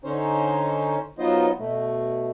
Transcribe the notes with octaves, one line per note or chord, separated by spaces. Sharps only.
D3 C#4 D#4 C5 C#5
F#3 B3 D#4 F4 C5 D#5
B2 A3